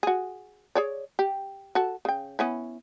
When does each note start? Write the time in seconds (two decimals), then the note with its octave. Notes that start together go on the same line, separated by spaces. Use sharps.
0.03 F#4 G#4
0.75 G#4 C#5 D5
1.19 G4
1.75 F#4 A4
2.05 C#3 G5
2.39 B3 C#4 E4